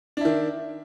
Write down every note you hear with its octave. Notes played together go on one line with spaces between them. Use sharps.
D#3 D4 E4